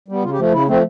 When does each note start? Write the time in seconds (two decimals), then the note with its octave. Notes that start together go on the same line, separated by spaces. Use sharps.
0.08 G3 B3
0.23 C#3 F4
0.33 G4
0.38 F3 A3
0.52 C#3 E4
0.68 F3 A3 C4